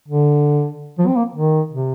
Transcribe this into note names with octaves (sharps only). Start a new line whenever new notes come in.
D3
F3
C4
A#3
D#3
C3